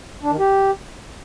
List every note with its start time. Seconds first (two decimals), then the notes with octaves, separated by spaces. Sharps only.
0.23 D4
0.31 D#3
0.39 G4